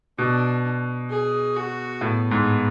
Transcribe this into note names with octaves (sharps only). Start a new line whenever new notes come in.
B2 D4
G#4
F#4
A2 B3
G#2